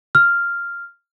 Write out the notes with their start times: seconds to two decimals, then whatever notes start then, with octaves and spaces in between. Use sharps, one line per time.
0.15 F6